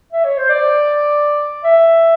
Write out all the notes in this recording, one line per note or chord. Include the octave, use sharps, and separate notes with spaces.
E5
C#5
C5
D5
E5